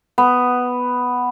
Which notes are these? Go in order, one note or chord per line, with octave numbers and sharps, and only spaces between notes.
B3